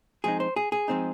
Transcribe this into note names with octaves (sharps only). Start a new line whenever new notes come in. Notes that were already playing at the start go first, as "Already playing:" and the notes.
F3 G#3 C4 D#4 G#4
C5
G#4
G#4
F3 G#3 C4 D#4